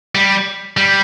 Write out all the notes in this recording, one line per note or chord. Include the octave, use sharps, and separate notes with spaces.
G3
G3